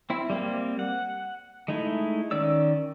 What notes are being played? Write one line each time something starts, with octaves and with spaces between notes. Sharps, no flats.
C4 E4
G3 A#3 C4
F#5
G#3 A3 D#4 E4
D#3 C#4 D5 E6